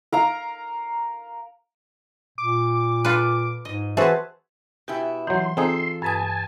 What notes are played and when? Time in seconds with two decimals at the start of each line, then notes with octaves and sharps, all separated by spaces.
0.12 A#4 F5 A#5
2.38 A#2 D6
3.05 F4 A4 B4
3.65 G#2 D#5
3.97 E3 F#4 G#4 B4 C5 E5 A5
4.88 B2 E4 G4 G5 G#5
5.27 E3 F#3 D#4 C6
5.57 C4 D#4 F4 G#4 A4
6.02 G2 B4 G#5 A5 D#6